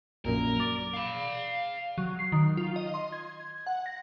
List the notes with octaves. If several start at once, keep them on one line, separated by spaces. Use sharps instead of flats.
A#1 F#2 A#2 A#4
D5
F5 B5
F#3
C7
D#3
F4
D#5
C6
G#6
F#5
A#6